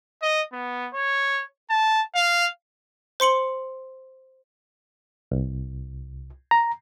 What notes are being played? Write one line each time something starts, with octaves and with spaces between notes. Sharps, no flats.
D#5
B3
C#5
A5
F5
C5 C6 C#7 F#7
C2
A#5